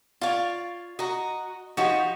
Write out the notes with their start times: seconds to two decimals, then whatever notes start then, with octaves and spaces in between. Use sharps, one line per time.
0.21 F4 C#5 D5 F5
0.99 F#4 D#5 A#5
1.77 F3 D#4 F#4 G4 C#5